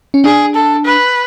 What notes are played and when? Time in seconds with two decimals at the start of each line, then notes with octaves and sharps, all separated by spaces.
0.14 C#4
0.24 D4 G#4
0.55 A4
0.84 B4